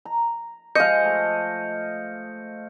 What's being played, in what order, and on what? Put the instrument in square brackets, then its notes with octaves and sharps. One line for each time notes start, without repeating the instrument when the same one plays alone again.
[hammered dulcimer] A#5
[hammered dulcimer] F3 G#3 [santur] D#5 F5 [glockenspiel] G6 C#7
[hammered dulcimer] A3